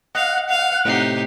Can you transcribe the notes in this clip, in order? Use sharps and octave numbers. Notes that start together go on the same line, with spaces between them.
D#5 F5 F#5
F5
A2 C3 D#4 G4 C7